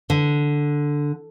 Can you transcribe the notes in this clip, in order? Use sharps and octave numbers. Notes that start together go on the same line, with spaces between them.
D3